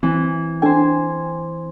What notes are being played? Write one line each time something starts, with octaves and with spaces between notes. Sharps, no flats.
E3 C4
D4 A4 C5 G5 G#5